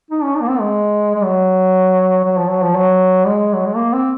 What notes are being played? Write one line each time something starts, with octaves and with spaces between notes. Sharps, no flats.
D#4
C#4
D#4
A#3
C4
G#3
G#3
F#3
F#3
F3
F#3
F3
F#3
G#3
F#3
G#3
A#3
C4